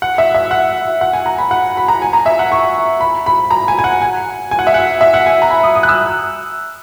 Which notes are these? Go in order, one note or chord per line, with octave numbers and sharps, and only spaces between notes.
F#5
E5
E5
F#5
F#5
G#5
A#5
B5
F#5
B5
A#5
G#5
A#5
E5
F#5
C#6
B5
B5
A#5
G#5
G#5
F#5
G#5
G#5
F#5
E5
F#5
E5
F#5
G#5
A#5
B5
D#6
D#6
F#6
E6